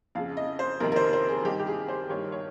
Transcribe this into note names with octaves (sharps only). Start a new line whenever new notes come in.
F2 C#3 F5
D#5
C5
F2 C3 D#3 A#4
A#4
C5
C5
G#4
G2 D#3 G4
G4
G#4
C5
G2 D#3 C#5
C#5